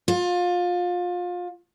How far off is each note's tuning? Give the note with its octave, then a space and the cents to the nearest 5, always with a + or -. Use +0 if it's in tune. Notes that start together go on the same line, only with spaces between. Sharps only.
F4 +25